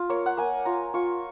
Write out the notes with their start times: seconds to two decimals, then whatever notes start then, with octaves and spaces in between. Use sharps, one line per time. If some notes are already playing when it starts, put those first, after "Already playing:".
Already playing: F4
0.10 A#3 C#5
0.26 F#5
0.37 A#3 G#5
0.65 F4 A#5
0.94 F4 C#6